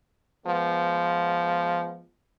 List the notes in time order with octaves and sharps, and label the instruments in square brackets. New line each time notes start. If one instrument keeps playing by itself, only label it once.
[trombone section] F3 G#3 B3